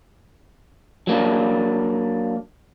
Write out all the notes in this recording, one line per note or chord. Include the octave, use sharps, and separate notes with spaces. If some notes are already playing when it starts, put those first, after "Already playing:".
F#3 A#3 D4